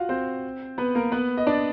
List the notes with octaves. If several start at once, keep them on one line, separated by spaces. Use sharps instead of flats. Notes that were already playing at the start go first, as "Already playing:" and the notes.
Already playing: F4 F#4 F5 F#5
C4 C5
B3 B4
A#3 A#4
B3 B4
D#5
D4 D5